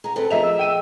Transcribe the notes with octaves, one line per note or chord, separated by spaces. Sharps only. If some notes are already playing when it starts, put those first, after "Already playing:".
B3 G#4 A#5
C4 G#4 A4 B4
F3 G#4 A#4 D#5 E5 A#5 F7
E6
G5 D#7